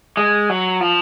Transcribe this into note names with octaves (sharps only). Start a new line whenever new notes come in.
G#3
F#3
F3